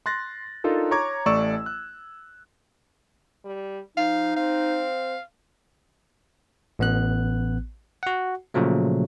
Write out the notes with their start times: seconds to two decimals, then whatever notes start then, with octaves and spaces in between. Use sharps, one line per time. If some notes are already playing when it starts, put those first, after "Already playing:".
0.06 C6 F#6 A6 A#6
0.64 D4 D#4 F4 A4 A#4
0.91 C#5 A#5 C#6 D6 G#6
1.26 A1 A3 D5 C#6 E6 E7
1.66 F#6
3.45 G3
3.97 F3 D#4 F5
4.37 C4 F5
6.79 A1 B3 F#6
8.03 F#4 F#5
8.54 A#2 C#3 F3 F#3 A3